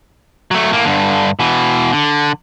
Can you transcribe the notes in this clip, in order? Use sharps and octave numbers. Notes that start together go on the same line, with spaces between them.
F#3 A3
A2 A#3
G2 D3
B2 E3
D3